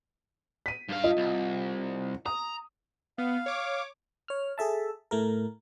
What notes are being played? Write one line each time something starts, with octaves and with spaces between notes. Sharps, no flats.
B6 D#7
G2 F5
F4 D#5
C2
A#5 D#6
B3 F5
C#5 D6
C#5 F6
G#4 A4 E5 A5
A2 A3 A#4